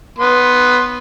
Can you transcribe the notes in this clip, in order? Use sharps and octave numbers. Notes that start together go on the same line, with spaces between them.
B3 C6